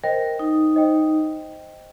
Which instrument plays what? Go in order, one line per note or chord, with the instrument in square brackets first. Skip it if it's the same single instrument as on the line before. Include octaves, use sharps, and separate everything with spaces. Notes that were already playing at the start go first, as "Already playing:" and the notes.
[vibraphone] A#4 [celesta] C5 D#5 G5
[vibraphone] D#4
[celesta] C5 D#5 G5